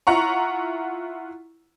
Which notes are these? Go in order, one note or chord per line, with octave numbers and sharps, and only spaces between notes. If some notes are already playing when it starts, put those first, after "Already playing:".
E4 F4 F#5 A#5 C#6